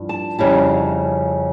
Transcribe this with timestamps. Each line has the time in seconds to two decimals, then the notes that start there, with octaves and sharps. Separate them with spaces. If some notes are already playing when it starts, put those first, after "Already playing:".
Already playing: G2 F3 E4
0.09 A5
0.39 F2 C#3 G3 C#4 E4 A5